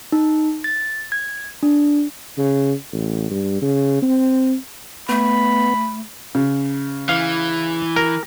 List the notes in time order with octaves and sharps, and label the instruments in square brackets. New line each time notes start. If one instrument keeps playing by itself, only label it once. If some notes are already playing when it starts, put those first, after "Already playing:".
[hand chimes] D#4
A6
G#6
D4
[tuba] C#3
A1
G2
C#3
C4
[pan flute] A3 [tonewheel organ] B3 [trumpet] B5
[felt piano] C#3
[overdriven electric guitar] E3 [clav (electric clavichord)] F5
[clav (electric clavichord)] A#4 [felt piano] A#6